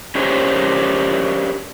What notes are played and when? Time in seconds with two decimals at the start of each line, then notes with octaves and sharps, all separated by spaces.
0.15 C#4 D4 G4 A#4 C5 C#5